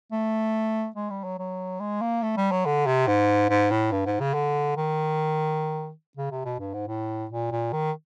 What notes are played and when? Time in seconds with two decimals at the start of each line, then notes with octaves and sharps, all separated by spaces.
0.12 A3
0.96 G#3
1.10 G3
1.24 F#3
1.39 F#3
1.80 G#3
2.01 A#3
2.23 A3
2.37 G3
2.51 F#3
2.65 D3
2.87 C3
3.07 G#2
3.49 G#2
3.71 A2
3.92 G2
4.06 G#2
4.21 C#3
4.34 D3
4.77 D#3
6.17 C#3
6.32 C3
6.45 B2
6.59 G2
6.74 G#2
6.88 A2
7.31 A#2
7.52 A#2
7.72 D#3